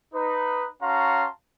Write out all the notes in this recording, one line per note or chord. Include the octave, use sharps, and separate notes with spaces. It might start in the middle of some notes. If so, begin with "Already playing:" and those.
D#4 B4
C#4 F#4 F5 A5 A#5 C6